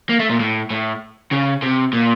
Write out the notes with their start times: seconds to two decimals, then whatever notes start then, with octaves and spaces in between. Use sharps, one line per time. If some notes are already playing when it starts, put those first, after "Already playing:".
0.09 A#3
0.19 A3
0.30 A#2
0.40 A2
0.71 A2
1.31 C#3
1.62 C3
1.93 A#2